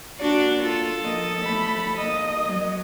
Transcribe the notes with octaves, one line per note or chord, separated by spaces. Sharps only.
A#3 D4 F#4 D5
F4 A4
F3 A#3 D#5
A3 B5
A#3 D#5
F#3